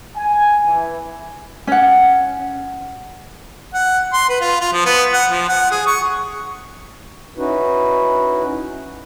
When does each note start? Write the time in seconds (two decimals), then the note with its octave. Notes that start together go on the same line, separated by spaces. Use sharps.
0.17 G#5
0.67 E3
1.67 C#4 F#5
3.74 F#5
4.13 C6
4.29 B4
4.41 F4
4.60 F4
4.73 F3
4.86 B3
5.13 F#5
5.31 F3
5.49 F#5
5.71 G#4
5.87 C#6
7.37 C#4 D#4 E4 F#4 B4